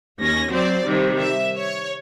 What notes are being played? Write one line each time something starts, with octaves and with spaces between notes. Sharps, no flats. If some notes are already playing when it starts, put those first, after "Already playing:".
D#2 C#4 A#6
F#3 C4 C5 D5
C3 D#3 G3
E5
C#5